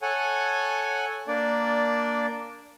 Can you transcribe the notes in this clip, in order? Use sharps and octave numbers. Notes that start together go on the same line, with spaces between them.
A4 C#5 F#5 G#5
A#3 D4 D5